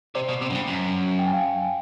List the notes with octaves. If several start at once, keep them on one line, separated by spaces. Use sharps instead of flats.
C3 C5 D5
B2
C3
F#2
G2
F#2
G5
G#5
F5 G5